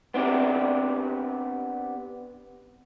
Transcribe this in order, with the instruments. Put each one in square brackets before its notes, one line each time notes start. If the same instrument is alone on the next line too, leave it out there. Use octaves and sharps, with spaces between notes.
[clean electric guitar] B3 C4 D4 G4